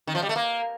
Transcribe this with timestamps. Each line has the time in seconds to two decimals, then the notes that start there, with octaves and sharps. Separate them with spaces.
0.07 D#3
0.15 F3
0.22 G3
0.29 A3
0.36 A#3